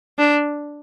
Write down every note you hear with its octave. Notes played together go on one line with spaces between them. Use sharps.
D4